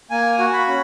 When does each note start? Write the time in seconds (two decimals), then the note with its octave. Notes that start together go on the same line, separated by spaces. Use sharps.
0.11 A#3 G#5
0.39 F#4
0.53 B5
0.68 C#4